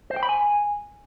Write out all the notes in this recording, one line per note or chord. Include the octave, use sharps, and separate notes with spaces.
C5
G5
B5
G#5